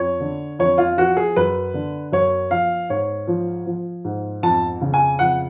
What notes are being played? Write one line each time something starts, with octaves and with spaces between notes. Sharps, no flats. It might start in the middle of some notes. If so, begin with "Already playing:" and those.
Already playing: F2 C#5
D3
F2 C#5
F4
F3 F#4
G#4
F#2 B4
D3
F#2 C#5
F3 F5
G#2 C#5
F3
F3
G#2
F2 A5
C#3
G#5
F2 F#5